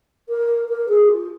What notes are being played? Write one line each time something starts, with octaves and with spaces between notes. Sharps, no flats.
A#4
A#4
G#4
F4